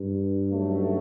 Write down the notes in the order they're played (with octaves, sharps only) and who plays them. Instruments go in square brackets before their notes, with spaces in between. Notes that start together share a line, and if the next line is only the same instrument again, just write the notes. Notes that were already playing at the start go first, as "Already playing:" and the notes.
Already playing: [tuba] G2
[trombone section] F#2 F#3 A3 D#4